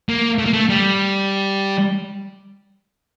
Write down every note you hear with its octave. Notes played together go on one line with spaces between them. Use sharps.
A#3
A3
A#3
A3
G3